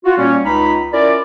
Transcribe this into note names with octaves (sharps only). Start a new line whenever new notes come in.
F4 F#4
A#2 G3 A#3 C#4
C#2 D#4 B5
C#4 E4 F4 A#4 D5